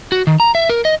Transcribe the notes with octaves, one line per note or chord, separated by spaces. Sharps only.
F#4
D#3
A#5
E5
A#4
D#5